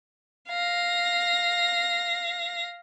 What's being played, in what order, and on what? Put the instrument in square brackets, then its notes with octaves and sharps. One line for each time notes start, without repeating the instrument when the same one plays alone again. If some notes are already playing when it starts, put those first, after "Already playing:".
[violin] F5 A#6